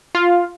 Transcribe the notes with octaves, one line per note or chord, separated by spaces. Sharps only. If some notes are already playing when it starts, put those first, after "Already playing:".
F4